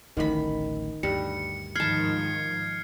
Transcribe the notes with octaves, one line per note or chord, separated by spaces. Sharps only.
D1 A1 A2 D#3 B5
D2 G2 G3 C#7
G#2 D#3 F3 A5 B5 F6 G#6 C7